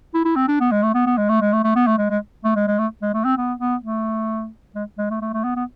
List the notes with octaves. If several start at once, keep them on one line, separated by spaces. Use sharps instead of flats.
E4
E4
C4
D4
B3
G#3
A3
B3
B3
G#3
A3
G#3
A3
A3
B3
A3
G#3
G#3
A3
G#3
G#3
A3
G#3
A3
C4
B3
B3
A3
G#3
G#3
A3
A3
A3
B3
B3